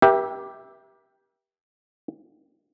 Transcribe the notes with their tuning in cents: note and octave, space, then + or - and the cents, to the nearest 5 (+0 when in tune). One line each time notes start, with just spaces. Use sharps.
G4 +0 A#4 +45 E5 +0